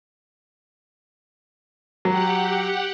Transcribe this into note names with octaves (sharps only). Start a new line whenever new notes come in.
F#3 G4 F#5